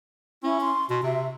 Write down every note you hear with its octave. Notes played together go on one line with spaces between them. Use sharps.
C#4 E4
C6
B2 C6
C3 E5